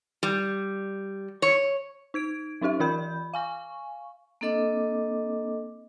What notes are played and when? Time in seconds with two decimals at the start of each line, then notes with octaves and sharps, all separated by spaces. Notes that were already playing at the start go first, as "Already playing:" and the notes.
0.23 G3
1.42 C#5
2.14 D#4 G#6 D7
2.61 F#3 C#4 D#4 G4 E5
2.80 E3 F4 A#4 B5 G6
3.34 F5 G#5 C#6
4.41 A#3 C4 D4 A4 D#5 D6